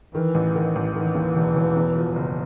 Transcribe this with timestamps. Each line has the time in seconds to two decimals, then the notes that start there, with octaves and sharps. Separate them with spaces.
0.15 D#3 E3
0.34 A1
0.55 D#3
0.75 A1
0.95 D#3 E3
1.15 D#2
1.36 E1
1.55 E1
1.76 E2
1.96 F3
2.15 F#1